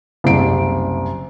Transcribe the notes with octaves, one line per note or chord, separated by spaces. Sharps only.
F#1 C2 G3 D7